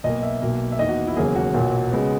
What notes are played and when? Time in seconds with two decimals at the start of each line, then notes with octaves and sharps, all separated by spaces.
0.04 B1 B2 A#3 D#5
0.23 E5
0.42 B1 B2 A#3
0.72 E5
0.79 E2 D#3 A#3 D#5
0.89 F#4
1.07 E4
1.16 E1 D#2 C#3 F#3 A#3 G#4
1.35 F#4
1.54 B1 A#2 F#3 A#3
1.91 C#3 G#3 B3